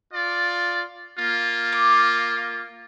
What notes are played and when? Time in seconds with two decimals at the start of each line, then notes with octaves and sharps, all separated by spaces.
0.13 F4 D5
1.18 A#3 F4
1.72 D6